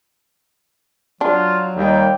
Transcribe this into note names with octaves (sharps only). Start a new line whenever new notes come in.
F#3 D4 F4
D#2 G3 G5